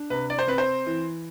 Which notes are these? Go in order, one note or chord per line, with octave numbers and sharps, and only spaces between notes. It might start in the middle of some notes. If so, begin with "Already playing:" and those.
Already playing: D4
C3 B4
D5
C5
C4 B4
C5
E3